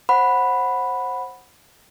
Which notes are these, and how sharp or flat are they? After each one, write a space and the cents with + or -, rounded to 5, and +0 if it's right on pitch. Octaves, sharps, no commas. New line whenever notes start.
C5 +20 F#5 -5 B5 +0